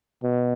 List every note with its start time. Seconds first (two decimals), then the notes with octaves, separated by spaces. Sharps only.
0.24 B2